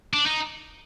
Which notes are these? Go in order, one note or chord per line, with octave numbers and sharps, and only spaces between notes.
D4
D#4